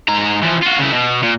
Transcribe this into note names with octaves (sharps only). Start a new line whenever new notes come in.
G#2 A#5
E3 F3
F4 F#4
C#3 E4
B2
A#2